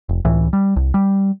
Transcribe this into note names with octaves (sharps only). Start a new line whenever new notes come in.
F1
C#2 A2 E3
G3
C2
G3